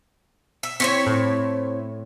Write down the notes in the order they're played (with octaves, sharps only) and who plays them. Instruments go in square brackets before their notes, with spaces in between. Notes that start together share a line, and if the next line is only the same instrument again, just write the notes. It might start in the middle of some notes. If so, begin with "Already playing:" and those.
[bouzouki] E5
[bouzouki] C4 E4 C#5 [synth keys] C#6 B6
[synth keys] A2